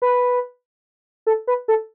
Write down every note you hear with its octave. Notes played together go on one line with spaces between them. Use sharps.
B4
A4
B4
A4